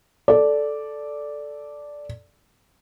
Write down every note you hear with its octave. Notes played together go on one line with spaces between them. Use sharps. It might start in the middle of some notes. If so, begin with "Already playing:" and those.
A4 D5